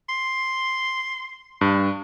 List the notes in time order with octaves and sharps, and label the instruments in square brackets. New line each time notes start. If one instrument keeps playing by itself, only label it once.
[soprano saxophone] C6
[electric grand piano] G2